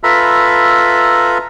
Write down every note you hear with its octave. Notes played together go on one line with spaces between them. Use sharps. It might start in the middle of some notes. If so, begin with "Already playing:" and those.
F4 A4 B4 E5 A#5 B5